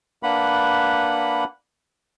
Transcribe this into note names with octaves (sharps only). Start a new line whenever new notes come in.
A#3 D4 B4 F#5 B5